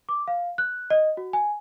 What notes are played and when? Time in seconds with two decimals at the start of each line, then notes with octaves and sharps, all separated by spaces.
0.09 D6
0.28 F5
0.58 F#6
0.90 D#5
1.17 F#4
1.33 G#5